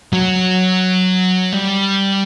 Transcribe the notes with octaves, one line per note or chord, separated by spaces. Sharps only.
F#3
G3